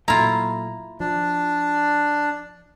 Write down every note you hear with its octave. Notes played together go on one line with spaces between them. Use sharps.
A#2 F#3 A3 E4 F4 A#5
F3 D4